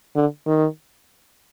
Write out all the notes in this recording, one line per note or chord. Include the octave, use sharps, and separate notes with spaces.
D3
D#3